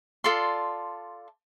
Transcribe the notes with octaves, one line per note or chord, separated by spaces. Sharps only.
F4 A4 D5 C6